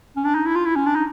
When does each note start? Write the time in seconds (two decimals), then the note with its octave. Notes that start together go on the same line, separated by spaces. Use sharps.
0.17 C#4
0.25 D4
0.35 D#4
0.46 E4
0.56 F4
0.66 E4
0.76 C#4
0.86 D4
0.95 D#4